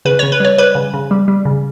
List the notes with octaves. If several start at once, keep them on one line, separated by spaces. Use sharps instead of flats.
C#3 B4
C#3 C#5
B4
G3 C#5
G3 B4
C#3
C#3
G3
G3
C#3